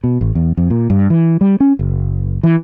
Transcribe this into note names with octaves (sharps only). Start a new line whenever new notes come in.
B2
A1
E2
F2
A#2
G2
E3
G3
C#4
F#1
E3